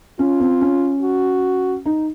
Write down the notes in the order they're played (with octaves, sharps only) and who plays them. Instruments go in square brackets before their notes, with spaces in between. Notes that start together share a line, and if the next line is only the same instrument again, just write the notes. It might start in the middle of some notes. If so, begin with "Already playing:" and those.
[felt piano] C#4 [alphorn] F4
[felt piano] C4
C#4
[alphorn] F#4
[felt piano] D#4